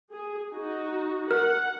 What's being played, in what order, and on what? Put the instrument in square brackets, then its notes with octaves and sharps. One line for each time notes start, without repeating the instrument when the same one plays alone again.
[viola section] G#4
D#4 F#4
[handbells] A#4 [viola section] F#5